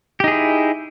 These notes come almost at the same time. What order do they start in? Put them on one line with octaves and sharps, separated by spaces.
G4 D#4 G#4 E4